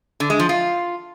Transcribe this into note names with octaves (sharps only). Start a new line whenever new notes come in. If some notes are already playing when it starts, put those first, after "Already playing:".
D3
G#3
F3
F4